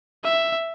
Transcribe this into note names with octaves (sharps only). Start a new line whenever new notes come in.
E5